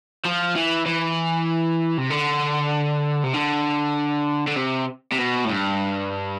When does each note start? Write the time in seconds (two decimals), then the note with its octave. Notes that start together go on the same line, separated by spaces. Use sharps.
0.25 F3
0.56 E3
0.86 E3
1.98 C3
2.10 D3
3.24 C3
3.33 D3
4.47 D3
4.56 C3
5.12 C3
5.18 B2
5.45 A2
5.49 G2